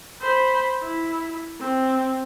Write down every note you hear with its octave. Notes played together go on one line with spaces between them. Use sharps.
C5 B5
E4
C4